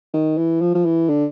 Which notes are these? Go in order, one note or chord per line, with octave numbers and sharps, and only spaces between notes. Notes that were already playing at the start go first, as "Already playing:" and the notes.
D#3
E3
F3
F3
E3
D3